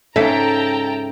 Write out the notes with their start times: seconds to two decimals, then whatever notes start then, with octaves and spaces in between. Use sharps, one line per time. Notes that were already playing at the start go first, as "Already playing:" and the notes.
0.16 G#2 C#3 A4 E5 G5 A5 A#5 B6